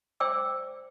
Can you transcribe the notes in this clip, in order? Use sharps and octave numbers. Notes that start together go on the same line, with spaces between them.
C5 D5 G5 D6 E6